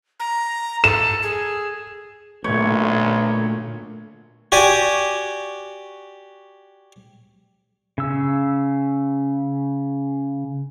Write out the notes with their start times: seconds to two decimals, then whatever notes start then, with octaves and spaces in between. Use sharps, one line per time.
0.20 A#5
0.84 A4 E7
1.22 G#4
2.44 B1 A#2 D3 A3 C#5
4.52 F#4 G4 D5 G#5
7.98 C#3 E6